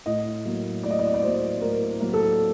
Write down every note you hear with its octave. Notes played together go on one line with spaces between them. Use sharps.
A2 D#5
F#3 A#3
A2 D5
D#5
D5
D#5
D5
F#3 A#3 C5
A2 A#4
F#3 A#3
A4